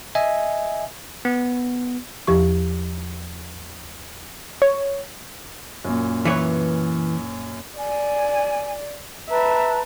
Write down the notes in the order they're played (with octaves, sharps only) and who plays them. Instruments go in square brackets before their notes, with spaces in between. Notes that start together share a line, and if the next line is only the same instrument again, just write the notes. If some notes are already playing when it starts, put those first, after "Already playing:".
[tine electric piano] D#5 E5 G#5
B3
[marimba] E2 F3 G4 C#6
[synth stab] C#5
[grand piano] F#2 A#2
[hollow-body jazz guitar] E3 B4 C#5
[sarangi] D5 [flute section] G#5
[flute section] B4 A5 A#5 [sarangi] E5